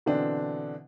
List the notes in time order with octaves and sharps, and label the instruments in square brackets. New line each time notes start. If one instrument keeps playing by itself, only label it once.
[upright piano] B2 D3 E3 C4 D4